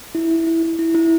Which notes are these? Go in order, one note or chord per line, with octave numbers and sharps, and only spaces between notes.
E4
E4
E4
E4
E4
E4